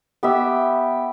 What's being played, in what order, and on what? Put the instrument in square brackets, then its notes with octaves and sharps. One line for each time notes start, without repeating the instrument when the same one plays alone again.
[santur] B3 G4 E5